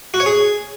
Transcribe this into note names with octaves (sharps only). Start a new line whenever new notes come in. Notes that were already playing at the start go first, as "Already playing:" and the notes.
F#4
C#5
G#4